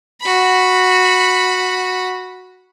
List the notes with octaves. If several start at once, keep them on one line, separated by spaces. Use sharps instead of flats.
F#4 B5